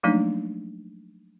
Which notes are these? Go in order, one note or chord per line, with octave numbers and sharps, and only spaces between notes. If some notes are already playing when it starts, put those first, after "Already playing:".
F3 F#3 A3 A#3 D4 D#4